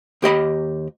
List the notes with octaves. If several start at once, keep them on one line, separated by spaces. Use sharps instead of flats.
D#2 G4 D#5 B5